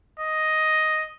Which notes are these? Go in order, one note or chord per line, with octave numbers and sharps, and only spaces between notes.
D#5